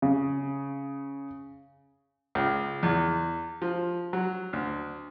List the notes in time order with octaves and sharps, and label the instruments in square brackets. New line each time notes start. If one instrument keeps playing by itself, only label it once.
[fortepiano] C#3
C#2
E2
F3
F#3
D2